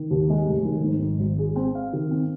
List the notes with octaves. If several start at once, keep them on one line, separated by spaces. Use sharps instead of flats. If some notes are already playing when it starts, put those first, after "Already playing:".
Already playing: D#3
D#2
G#3
F1
D#3
G#2
G#1
G#1
G#4
C4
F5
D#3
C4